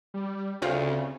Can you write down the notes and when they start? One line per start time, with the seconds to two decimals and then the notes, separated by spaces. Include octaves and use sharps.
0.14 G3
0.62 D2 C#3 C4 F4